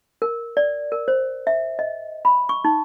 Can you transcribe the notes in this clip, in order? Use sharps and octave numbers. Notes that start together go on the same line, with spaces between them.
A#4
D5
A#4
C5
E5
D#5
B5
C#6
D#4